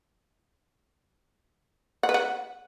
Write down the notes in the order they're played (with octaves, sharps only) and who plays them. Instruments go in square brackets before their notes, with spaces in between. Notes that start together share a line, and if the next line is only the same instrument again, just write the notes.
[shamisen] F#5
B4
F#5